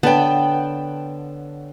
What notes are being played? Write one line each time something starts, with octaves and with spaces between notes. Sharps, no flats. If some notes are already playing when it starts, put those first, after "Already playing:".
D3 B3 C#5 G5 A5